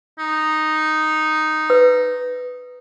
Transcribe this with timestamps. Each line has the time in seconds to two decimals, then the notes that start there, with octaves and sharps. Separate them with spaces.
0.19 D#4
1.70 B4